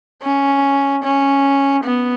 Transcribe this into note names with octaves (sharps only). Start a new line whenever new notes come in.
C#4
C#4
B3